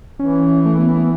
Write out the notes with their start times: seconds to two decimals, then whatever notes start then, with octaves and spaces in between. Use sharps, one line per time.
0.19 E3 C#4
0.65 A3
0.78 B3
0.97 B3